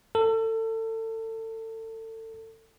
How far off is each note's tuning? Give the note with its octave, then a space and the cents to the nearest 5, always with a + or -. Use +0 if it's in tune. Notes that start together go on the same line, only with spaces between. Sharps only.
A4 +30